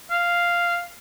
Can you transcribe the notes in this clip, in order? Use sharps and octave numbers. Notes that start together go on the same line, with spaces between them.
F5